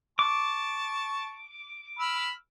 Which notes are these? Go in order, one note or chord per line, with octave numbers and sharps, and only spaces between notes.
A5 C#6 D6
B5 E6 F6